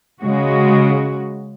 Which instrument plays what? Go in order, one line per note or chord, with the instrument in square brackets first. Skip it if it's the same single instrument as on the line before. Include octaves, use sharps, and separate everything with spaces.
[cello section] C#3 G#3 F#4